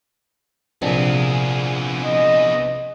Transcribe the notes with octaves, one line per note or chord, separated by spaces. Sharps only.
A#1 C3 B3 C4 D4 G#4
D#5